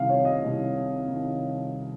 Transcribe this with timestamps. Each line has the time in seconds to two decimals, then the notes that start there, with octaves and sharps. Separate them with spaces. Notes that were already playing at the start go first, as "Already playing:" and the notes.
Already playing: C2 C3 D#3 F5
0.09 C#5
0.25 D#5
0.42 C2 C3 D#3
1.08 D#3